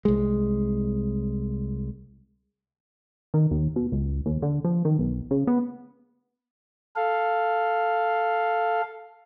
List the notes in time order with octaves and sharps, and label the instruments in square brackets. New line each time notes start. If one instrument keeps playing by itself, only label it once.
[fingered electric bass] C2 G#3
[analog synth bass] D#3
D#2
B2
C#2
D#2
D3
F3
D#3
B1
C#3
B3
[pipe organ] A4 F5